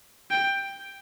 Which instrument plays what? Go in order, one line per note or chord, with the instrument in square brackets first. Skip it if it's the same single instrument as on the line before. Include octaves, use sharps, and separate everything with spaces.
[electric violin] G5